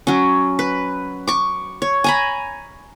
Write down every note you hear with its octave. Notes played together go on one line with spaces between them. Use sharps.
F#3 C#4
B4
C#6 D6
C#5
G#5 A#5 B5